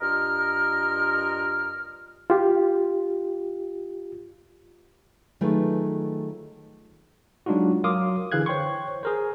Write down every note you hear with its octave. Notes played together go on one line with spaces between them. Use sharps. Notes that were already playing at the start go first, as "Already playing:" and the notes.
G2 F4 A#4 D#5 F6
F4 G4
D#3 F#3 A3 F4 G#4 B4
F#3 G#3 D4 D#4 F4 F#4
F#3 A#4 F5 C6 D6 D#6
D3 E3 G#4 F5 F#6 G#6
C5 C#5 G5 C6 C#6
G#4 A#4 C5